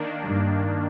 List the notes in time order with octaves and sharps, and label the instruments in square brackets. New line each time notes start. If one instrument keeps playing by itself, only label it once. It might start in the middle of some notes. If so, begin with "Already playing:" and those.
Already playing: [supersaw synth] D#3 A#3 D4
[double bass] G2